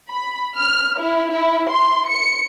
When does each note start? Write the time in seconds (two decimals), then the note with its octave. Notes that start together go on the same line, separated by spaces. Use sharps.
0.10 B5
0.57 F6
1.00 E4
1.31 E4
1.70 C6
2.08 C#7